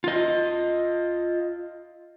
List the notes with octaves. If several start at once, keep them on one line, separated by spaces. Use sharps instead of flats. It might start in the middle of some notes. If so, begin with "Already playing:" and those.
F4 D#5